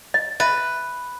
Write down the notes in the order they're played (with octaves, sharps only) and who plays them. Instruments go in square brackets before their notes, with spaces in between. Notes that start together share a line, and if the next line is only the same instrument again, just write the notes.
[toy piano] D#5
[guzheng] B4 [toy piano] D#5 E5